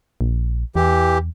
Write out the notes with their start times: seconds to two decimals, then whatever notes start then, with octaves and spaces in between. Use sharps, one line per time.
0.21 A#1
0.76 E2 E3 G4